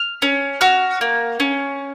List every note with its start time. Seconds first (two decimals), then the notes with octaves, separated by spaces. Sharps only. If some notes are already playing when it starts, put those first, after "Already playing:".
Already playing: F6
0.22 C#4
0.61 F#4 F6
1.01 A#3
1.40 C#4